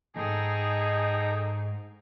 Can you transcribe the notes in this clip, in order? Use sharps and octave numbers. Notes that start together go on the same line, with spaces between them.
D#2 G#2 D#4 G#4 A4 G5 A#5